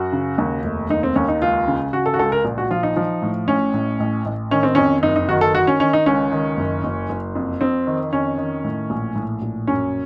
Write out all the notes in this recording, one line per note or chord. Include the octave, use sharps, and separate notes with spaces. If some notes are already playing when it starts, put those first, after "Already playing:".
Already playing: F#2 F#4
C#3
D#2
F1
D#2 D#4
C4
D#2 C#4
D#4
C#2 F4
C#3
C#3 F#4
A4
F#4
C#2 A4
A#4
A#1
F#4
F3 F4
D#4
F3
A2
A1 C#4
A2
A1
A1
D#3 C#4
C4
F2 C#4
F#1 D#4
D#4
D#3 F#4
A4
D#3 F#4
C#4
D#3 C#4
D#4
C#2 C#4
D#3
F#1
F#1
F#1
F2
F2 C4
D#3
F2 C#4
D#3
A2
A#1
A2
A#1
F#2 C#4